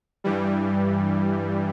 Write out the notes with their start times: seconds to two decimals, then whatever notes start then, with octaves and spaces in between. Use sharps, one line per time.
0.24 G2 E3 G3